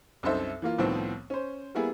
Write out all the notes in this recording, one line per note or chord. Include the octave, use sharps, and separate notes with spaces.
C2 F#2 D#4 A4 C5 E5
E3 A#3 F4
C2 A2 D#3 F3 B3 C4
C#4 C5
G3 A#3 B3 E4 G#4